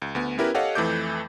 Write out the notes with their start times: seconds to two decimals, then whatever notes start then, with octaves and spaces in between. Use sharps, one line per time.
0.02 C#2
0.15 D2 B3
0.38 B3 C#4 E4 G4 A#4 B4
0.54 G4 A4 C#5 D#5 F5 F#5
0.75 F2 E3 A3 A4 D6 G6